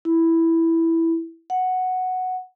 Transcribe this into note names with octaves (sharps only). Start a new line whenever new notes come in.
E4
F#5